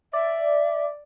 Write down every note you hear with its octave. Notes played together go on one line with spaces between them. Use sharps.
D5 E5